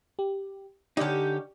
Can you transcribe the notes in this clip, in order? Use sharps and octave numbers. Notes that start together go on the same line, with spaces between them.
G4
D3 C#4 D#4 G4 D5